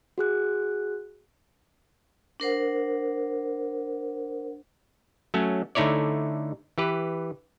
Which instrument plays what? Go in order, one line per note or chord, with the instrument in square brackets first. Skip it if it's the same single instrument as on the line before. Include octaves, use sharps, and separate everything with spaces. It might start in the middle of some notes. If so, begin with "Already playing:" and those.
[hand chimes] F#4 G#4 F#6
[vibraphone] D4 A#4 C5 F#5
[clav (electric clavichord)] F#3 A3 C#4
D3 A3 D#4 E4 C#5 D5
E3 G4 B4